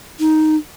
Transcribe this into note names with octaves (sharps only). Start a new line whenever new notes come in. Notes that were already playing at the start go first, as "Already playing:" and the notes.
D#4